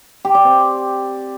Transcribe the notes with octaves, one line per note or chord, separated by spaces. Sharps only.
G4
D5
C4